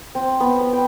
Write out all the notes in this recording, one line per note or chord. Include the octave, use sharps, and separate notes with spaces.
C4
B3
B5
G5